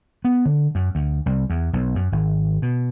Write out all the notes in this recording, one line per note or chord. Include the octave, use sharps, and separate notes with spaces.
B3
D3
F#2
D2
C2
E2
B1
F#2
G#1
B2